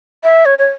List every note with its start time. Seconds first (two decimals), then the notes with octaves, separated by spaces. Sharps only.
0.24 E5
0.45 C#5
0.58 C#5